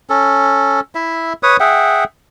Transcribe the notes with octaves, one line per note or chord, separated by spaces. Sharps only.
C#4 A4
E4 E5
B4 C#5 D#6
G#4 E5 F#5 G5